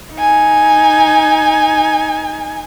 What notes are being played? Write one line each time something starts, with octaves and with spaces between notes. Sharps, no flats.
D#4 G#5